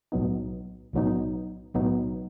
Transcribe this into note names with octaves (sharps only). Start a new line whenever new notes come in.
B1 A2 F#3 B3 D#4
B1 A2 F#3 B3 D#4
B1 A2 F#3 B3 D#4